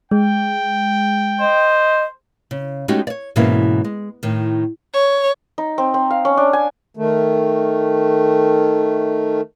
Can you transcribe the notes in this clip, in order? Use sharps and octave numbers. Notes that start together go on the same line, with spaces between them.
G#3 G5
C5 D#5
C#3
G#3 A3 C#4 D#4 F#4 G4
C#5 D5
G#2 B2 E3 A#3 C#4 E4
G#3
A2 D#3
C#5
D#4
C4
C4
F5
C#4
D4
G#5
D#3 A3